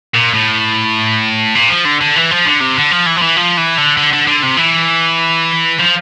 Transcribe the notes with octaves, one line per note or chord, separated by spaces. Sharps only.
A#2
A2
A#2
F3
D3
D3
E3
F3
D3
C3
D3
F3
E3
F3
E3
F3
E3
D3
D3
D3
D3
C3
E3
F3